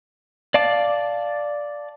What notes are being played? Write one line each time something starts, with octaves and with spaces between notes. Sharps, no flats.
D5 F5 A5 D6